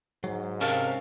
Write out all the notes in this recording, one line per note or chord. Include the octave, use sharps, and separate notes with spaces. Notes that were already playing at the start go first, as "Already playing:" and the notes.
G#2 F#3
C3 C#4 A#4 F5 A5